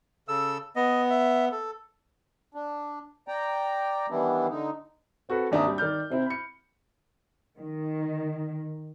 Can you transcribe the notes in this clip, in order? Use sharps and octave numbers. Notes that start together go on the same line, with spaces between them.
C#3 A4 E6
B3 D#5
E5
A4
D4
D5 G5 A#5
D#3 E3 G3 B3 D4 E4
D3 D#4
C4 F#4 A4 B4
G#1 D#2 D4 E5 A#5 D#6
G3
D#3 D5 F6 G6
C3 C4 E4
B5 C#7
D#3